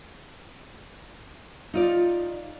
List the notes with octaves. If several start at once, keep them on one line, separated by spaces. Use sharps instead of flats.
D#4 F4 D5